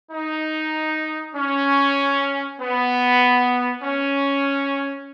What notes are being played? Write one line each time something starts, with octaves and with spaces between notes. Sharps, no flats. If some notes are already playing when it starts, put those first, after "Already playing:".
D#4
C#4
B3
C#4